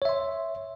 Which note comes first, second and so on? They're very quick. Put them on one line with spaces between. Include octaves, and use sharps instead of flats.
C#5 E5 C6